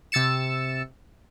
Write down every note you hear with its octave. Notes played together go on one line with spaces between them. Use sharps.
C3 E6 A6 C#7 E7